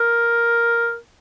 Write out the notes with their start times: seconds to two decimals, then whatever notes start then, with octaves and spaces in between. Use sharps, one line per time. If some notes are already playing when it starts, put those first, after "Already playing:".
Already playing: A#4